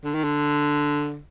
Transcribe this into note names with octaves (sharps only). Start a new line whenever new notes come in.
D3
D#3
D3